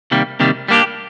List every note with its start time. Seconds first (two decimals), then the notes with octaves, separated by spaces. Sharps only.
0.11 C3 D#3 G3 A#3
0.40 C3 D#3 G3 A#3
0.68 G3 A#3 D4 G4